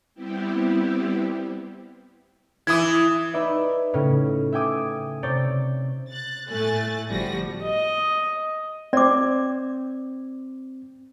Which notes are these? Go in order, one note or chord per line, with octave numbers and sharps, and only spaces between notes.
G3 B3 C4 E4 G4
E3 E4 D#6 G#6
D#4 B4 D5 E5
A2 C#3 C#4
E5 G5 G#5 D6 D#6
C3 C#5 D5 G6 A6
F#6 A6
A2 A3 G#5 F#6 A6
G1 F3 G3 F#4 A#6
D#5
C4 D5 D6